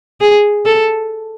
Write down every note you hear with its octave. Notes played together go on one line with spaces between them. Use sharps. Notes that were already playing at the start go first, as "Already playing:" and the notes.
G#4
A4